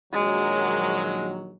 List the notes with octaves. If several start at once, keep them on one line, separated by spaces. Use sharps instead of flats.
A#1 D#3 F#3 G#3